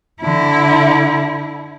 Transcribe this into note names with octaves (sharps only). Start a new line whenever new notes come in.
D3 E4